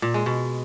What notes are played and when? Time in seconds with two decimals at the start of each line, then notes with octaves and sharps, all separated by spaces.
0.02 A#2
0.14 G#3
0.26 B2